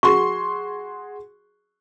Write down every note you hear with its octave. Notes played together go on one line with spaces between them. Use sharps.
F#4 G#4 C6 C#6